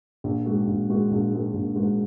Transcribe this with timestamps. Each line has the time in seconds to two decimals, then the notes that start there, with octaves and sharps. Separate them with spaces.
0.24 A#1
0.46 G#2 G#3 F#4
0.67 A#1
0.89 G#2 G#3 F#4
1.11 A#1
1.33 G#2 G#3 F#4
1.54 A#1
1.76 G#2 G#3 F#4